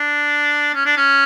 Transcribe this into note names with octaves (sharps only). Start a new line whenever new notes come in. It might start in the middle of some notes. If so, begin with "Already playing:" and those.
Already playing: D4
C#4
D4
C#4